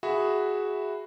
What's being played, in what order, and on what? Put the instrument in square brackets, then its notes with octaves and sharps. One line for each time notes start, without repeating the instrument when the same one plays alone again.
[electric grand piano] F#4 G#4 E5 B5